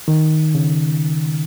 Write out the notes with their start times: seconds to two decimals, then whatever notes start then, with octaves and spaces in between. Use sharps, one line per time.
0.08 D#3
0.55 C#3